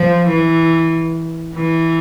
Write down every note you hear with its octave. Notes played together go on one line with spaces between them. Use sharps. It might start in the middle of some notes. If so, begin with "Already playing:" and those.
Already playing: F3
E3
E3